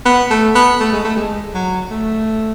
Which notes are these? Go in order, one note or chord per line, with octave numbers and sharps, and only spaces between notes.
B3
A3
B3
A3
G#3
A3
G#3
F#3
A3